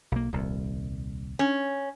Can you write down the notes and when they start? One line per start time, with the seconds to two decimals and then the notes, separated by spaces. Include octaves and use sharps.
0.12 B1 A#3
0.33 D#1 C2
1.39 C#4